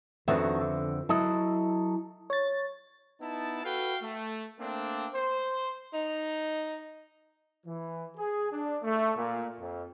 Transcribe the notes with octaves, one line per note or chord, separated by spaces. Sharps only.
F2 D#3 B3 D4 F#4 E5
D3
F#3 E4 A4 D#5
C#5 A6
B3 D#4 E4 A5
F#4 A4 B4 F5 G5
A3
A3 A#3 C4 D4
C5
D#4
E3
G#4
D4
A3
A#2
F2